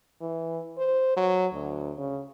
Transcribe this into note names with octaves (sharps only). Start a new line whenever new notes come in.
E3
C5
F#3
D2
C#3